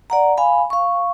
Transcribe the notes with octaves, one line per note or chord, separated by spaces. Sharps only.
D5 F#5 A#5
F5 G#5 B5
F5 C#6